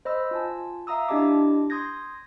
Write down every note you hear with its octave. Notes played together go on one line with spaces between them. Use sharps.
C5 D#5 B5 E6
F4 G#5 A5
E5 F5 A#5 D#6 E6
D4 E4 G4 D#5 A5 D6
C6 D#6 G6 G#6 A#6